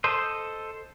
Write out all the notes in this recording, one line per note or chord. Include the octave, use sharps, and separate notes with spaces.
A4 C5 D#5